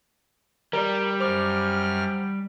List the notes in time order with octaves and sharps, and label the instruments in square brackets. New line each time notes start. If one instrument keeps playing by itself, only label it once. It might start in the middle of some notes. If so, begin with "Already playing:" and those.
[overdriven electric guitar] G3 [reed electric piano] A#4 D5
[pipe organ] F#2 F6 [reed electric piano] C5 D6